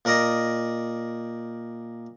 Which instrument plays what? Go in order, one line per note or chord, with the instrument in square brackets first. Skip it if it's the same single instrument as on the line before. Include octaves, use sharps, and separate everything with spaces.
[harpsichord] A#2 A#4 D5 D#5 A#5